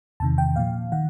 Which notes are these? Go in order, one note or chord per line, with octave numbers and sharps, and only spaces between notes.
E2 C3 D#3 A5
G5
A#2 F3 F5
D#3 F#5